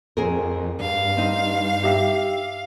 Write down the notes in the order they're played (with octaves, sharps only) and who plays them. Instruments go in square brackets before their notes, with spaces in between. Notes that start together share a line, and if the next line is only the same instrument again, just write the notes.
[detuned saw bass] F2 [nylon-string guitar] C4 G#4 A#4
[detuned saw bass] G2 [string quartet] F5
[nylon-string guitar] C4 D#4
[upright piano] G4 E5